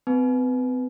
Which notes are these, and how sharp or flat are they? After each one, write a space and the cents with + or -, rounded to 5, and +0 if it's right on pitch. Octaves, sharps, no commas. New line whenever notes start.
C4 -45 B4 +0 G#5 +35